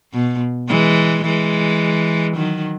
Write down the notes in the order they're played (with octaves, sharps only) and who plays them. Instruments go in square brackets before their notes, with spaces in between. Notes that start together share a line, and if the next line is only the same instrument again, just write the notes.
[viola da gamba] B2
E3 G#3
E3 G#3
D#3 F#3